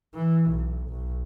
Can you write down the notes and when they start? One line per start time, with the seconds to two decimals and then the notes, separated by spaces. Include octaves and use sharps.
0.15 E3
0.50 B1
0.89 B1